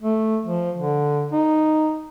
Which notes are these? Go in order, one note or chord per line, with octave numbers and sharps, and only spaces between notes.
A3
F3
D3
D#4